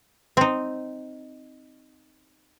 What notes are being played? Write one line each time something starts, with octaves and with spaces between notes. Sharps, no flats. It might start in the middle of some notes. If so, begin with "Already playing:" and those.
C4 D#4